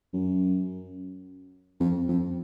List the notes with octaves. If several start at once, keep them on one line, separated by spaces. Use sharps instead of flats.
F#2
F2
F2